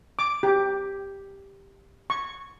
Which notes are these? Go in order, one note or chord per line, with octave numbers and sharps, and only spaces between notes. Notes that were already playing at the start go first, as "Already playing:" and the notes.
D6
G4
C#6